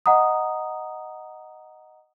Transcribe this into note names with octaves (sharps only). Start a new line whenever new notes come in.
D#5 F#5 A#5 D#6